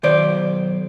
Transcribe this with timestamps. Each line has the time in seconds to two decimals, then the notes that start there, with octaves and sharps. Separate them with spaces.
0.03 B1 D#3 C5 D5